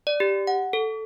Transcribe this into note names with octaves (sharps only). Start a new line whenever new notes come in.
D5
G4
F#5
A4